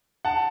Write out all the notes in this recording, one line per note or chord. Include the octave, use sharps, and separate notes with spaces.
F#5 A5